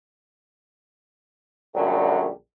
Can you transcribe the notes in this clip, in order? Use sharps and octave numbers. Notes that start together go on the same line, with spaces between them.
A#1 F#2 D3 F#3 G3 A3